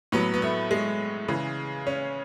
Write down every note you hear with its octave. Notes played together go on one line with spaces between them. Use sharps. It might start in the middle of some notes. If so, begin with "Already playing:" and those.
A2 F#3 B3
B3
A3
G#3
C#3 E3
C#4